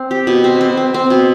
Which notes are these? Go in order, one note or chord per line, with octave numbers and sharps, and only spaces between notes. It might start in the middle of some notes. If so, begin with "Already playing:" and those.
Already playing: C4
G4
B2
C4
C4
C4
C4
B2